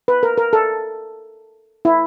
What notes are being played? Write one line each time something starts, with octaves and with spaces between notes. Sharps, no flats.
B4
A#4
A#4
A4
E4